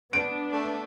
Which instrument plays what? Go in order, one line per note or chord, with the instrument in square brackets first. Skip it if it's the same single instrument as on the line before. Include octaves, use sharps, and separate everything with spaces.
[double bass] B3 [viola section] D4 [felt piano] D7
[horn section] A3